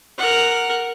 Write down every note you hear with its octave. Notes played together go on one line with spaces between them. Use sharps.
A#4 F#5